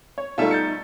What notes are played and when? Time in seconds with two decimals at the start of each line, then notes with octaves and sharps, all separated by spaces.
0.18 C#5
0.38 B2 G3 A3 D#4 F4 A4 E5
0.51 G6 A6 C#7